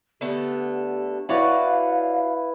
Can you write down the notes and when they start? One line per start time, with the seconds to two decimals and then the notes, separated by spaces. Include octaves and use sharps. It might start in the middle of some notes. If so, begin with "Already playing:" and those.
0.21 D3 A3 B3 G4
1.29 E4 F#4 B4 C#5 D5 F5